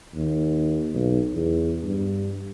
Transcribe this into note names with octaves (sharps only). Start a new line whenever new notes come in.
D#2
B1
E2
G2